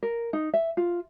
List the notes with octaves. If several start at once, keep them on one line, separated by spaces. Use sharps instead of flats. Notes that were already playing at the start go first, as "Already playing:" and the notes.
A#4
D#4
E5
F4